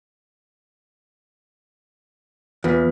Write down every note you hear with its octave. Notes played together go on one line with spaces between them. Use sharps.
E2 F4 B4